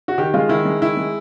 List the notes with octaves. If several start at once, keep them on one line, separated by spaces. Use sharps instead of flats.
F#4
D#3 G4
G#3 F4
D#3 E4
G#3
D#3 E4
G#3